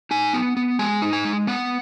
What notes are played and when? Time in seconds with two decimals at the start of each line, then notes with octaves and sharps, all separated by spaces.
0.11 D#4 G#5
0.33 B3
0.57 B3
0.79 G#3 G#5
1.02 D#4
1.13 G#5
1.25 G#3
1.47 B3 F#5